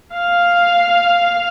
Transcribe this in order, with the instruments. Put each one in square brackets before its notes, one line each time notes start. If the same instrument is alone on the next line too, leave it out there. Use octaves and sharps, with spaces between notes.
[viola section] F5